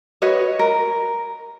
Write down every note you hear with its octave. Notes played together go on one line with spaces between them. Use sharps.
F#4 B4 C#5 D#5
A#4